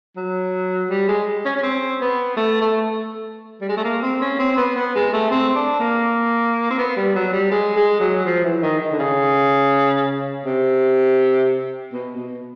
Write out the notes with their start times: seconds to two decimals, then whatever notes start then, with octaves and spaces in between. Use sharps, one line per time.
0.16 F#3
0.90 G3
1.08 G#3
1.45 C#4
1.56 C#4
1.63 C4
2.01 B3
2.37 A3
2.61 A3
3.61 G3
3.69 G#3
3.77 A3
3.84 A#3
4.02 C4
4.21 C#4
4.39 C4
4.57 B3
4.76 B3
4.95 G#3
5.13 A3
5.31 C4
5.55 D4
5.80 A#3
6.70 C4
6.78 B3
6.97 G3
7.16 F#3
7.33 G3
7.51 G#3
7.76 G#3
8.00 F#3
8.25 F3
8.44 E3
8.62 D#3
8.80 D#3
8.92 D3
8.99 C#3
10.45 C3
11.93 B2
12.17 B2